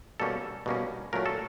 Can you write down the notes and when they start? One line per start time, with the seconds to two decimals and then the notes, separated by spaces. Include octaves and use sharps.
0.20 B2 G3 A#3 C#4 A4
0.66 B2 G3 A#3 C#4
1.13 A#2 F#3 A3 C#4 A#4
1.26 A4